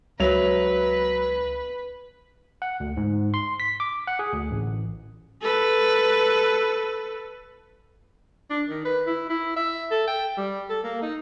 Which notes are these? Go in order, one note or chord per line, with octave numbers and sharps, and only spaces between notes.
C#2 F#3 B4 E5 F7
F#5
D2
G#2
C6
B6
D6
F#5
G#4
D2
A1
A4 B4
D4
D#3
B4
E4
E4
E5
A4
G5
G3
A4
A#3
D#4